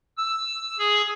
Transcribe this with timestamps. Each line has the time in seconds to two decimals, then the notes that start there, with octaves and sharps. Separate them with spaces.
0.17 E6
0.79 G#4